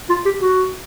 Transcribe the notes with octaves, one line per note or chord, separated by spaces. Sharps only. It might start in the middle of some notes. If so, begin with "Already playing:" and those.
F4
G4
F#4